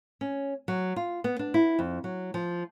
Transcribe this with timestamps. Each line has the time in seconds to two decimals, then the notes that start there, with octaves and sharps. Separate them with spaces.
0.21 C#4
0.68 F#3
0.96 F4
1.24 B3
1.39 D4
1.54 E4
1.79 F2
2.04 F#3
2.34 F3